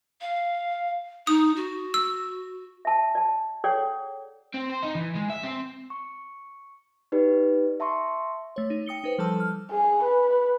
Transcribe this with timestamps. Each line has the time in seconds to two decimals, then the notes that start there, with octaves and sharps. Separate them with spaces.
0.21 F5
1.27 D#4 D#6
1.56 F#4
1.94 E6
2.85 E5 A5
3.15 D5 A5
3.64 G#4 A4 C#5 D5 F#5 G5
4.54 C4
4.70 C5
4.83 D#4
4.95 E3
5.16 G#3
5.30 E5
5.44 C4
5.90 C#6
7.12 D#4 G4 B4 D5
7.80 E5 A5 C6 C#6
8.56 A3 C#5
8.70 D#4
8.86 G5 D#6 C#7 G7
9.04 D#4 B4 C5
9.18 F3 G3 A4 A5 E6
9.40 F6
9.71 G#4
10.03 B4